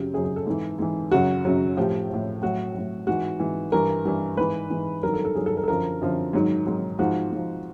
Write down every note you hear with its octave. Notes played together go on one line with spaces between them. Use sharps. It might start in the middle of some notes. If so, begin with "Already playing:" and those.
Already playing: F#2 C#3 F#3 G4
F#2 C#3 F#3 G#4
G#4
A4
G#2 E3
G#2 E3
F#2 C#3 F#3 F#4
F#2 C#3 F#3
A2 F3 G4
A2 F3
A2 F#3 F#4
A2 F#3
G#2 E3 F#4
G#2 E3
G2 E3 A#4
G2 E3
G#2 E3 B4
G#2 E3
G2 D#3 F#3 A#4
A4
A4
G2 D#3 F#3 G#4
A4
A#4
A4
F#2 D3 F3 A#4
F#2 D3 F3
G#2 D#3 F#3
G#2 D#3 F#3
G#2 F3 F#4
G#2 F3